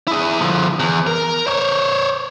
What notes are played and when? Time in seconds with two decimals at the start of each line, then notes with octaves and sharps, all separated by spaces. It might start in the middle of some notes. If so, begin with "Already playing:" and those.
0.08 E4 G#4
0.41 D3 F3
0.80 E2
1.07 A#4
1.47 C5 C#5